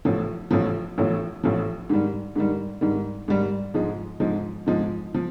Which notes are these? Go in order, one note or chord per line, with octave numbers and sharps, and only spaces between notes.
A1 A2 F3
A1 A2 F3
A1 A2 F3
A1 A2 F3
G#2 D#3 G3
G#2 D#3 G3
G#2 D#3 G3
G#2 D#3 G3
G#2 F3 G#3
G#2 F3 G#3
G#2 F3 G#3
F3